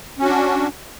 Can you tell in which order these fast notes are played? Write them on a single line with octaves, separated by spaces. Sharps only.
C#4 F#4 D4